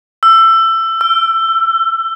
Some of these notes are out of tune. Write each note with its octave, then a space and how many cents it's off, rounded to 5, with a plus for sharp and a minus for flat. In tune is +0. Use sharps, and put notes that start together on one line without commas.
E6 +20
E6 +40